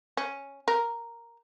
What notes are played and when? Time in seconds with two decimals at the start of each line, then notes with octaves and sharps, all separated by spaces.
0.17 C#4
0.68 A#4